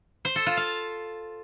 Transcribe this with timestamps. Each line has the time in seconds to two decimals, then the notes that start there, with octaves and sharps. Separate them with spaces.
0.25 C5
0.36 A4
0.46 F4
0.57 F5